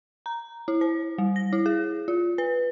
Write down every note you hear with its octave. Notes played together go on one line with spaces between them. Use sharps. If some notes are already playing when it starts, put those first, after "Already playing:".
A#5
E4
C5
G3
A#6
E4
G#4
F4
B4